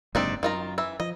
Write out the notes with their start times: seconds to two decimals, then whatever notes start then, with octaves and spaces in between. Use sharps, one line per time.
0.15 F#1 G#2 C3 C4 D4 D#4
0.43 F#2 D#3 F4 A#5
0.78 E3 E5
1.00 F3 D#5